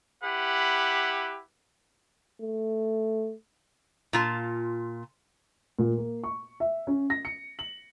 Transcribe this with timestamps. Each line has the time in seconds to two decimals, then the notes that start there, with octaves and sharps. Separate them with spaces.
0.23 E4 G4 B4 F#5
2.42 A3
4.13 A#2 F4 A5
5.79 A#2
5.98 A#3
6.24 C#6
6.60 E5
6.87 C#4
7.10 A#6
7.25 C#7
7.59 F#7